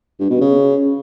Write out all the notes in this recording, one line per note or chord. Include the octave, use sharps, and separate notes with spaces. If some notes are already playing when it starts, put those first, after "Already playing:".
G2
B2
C#3